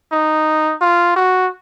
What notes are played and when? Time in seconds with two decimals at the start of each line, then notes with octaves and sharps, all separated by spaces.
0.12 D#4
0.81 F4
1.16 F#4